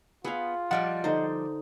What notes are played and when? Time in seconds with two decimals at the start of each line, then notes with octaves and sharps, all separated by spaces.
0.24 B3 F4 G#4 F5
0.71 F3 G3 D5 D#5 F#5
1.04 D3 D#4 C5